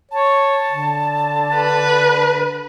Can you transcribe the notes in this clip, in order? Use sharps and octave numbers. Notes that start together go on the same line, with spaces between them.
C#5 A5
D3
B4